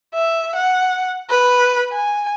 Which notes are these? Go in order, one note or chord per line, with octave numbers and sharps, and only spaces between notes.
E5
F#5
B4
G#5